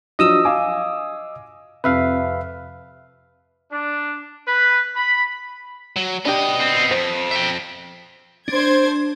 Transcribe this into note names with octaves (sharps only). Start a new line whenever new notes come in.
F3 F#3 D4 D#5 D#6 E6
F5 G#5 D6
F2 C3 B4 E5 F5
D4
B4
B5
F#3
B3 D4 G4 D#5
C4
F2 C5
E5 G5
D4 C5 G#6